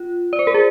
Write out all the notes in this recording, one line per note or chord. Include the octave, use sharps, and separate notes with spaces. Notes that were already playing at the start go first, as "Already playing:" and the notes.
Already playing: F4
D5
C5
A#4
G#4